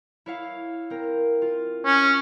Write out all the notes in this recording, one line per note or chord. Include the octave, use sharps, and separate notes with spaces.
E4 C#5 F5
C4 A#4
F4
C#4